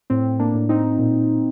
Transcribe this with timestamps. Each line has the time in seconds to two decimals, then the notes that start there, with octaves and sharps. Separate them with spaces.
0.10 A2 C4
0.39 A#3 D4
0.54 A2
0.69 C4 D#4
0.99 A#2